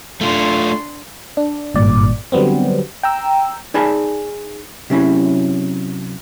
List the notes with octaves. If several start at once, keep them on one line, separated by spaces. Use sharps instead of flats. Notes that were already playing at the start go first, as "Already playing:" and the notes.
A3 D4 F4 C6
D4
G#1 G2 A#2 D5
D3 F#3 G3 B3 C4
G5 A#5 E6
D#4 G#4 D5 G#5 A5 B5
C3 F#3 C#4 E4